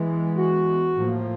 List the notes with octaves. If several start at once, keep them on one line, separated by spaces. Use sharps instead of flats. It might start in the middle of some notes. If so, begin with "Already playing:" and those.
Already playing: E3 G#3 B3
F#4
A2 F3 A#3